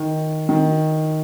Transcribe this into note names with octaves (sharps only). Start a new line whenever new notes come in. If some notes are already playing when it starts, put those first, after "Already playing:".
Already playing: D#3
D#3